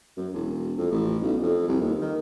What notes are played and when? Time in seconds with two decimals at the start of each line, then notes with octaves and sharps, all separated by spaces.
0.17 F#2
0.33 E1
0.77 F2
0.91 A1
1.22 B1
1.42 F2
1.68 C2
1.80 D#2
2.01 D#3